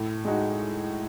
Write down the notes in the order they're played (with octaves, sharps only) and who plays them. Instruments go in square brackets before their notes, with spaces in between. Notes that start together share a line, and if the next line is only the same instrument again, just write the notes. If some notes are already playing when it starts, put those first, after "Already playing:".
Already playing: [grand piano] A2
G#3 D#4 F#4